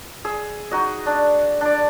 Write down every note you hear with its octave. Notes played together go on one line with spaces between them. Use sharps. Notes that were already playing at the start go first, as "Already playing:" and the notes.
G#4 E6
D#4 F#4 D#5
D4
D4 D5